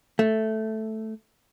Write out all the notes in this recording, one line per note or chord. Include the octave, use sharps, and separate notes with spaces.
A3